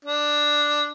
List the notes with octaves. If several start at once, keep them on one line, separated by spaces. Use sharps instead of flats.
D4